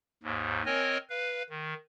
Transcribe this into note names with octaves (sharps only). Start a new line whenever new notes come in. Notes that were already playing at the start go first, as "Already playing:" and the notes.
D#2 G#2
C4 A#4 C#5 D#5 G#5
B4 F5
D#3